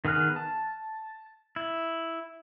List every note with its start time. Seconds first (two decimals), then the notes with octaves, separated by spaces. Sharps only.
0.05 D#3 B3 G#4 F6 F#6
0.36 A5
1.56 E4